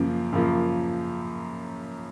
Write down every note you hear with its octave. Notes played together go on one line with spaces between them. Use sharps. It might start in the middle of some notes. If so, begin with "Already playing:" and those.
Already playing: F#2 C#3 F3 A#3
F#2 C#3 F3 A#3